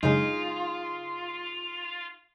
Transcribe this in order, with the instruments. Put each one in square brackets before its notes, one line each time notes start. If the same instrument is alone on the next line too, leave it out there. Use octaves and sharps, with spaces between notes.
[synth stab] F#2 C#3 G#3 [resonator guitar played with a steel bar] D#4 G#4 [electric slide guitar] F4